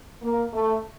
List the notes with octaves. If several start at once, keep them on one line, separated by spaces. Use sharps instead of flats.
A#3
A3